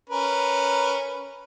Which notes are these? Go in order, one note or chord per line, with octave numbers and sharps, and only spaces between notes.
C#4 A#4 B4